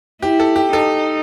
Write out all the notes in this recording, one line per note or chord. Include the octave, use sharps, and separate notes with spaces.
E4 G4
A4
G4
D#4 A4